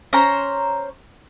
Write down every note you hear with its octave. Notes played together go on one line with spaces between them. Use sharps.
C#4 C5 A#5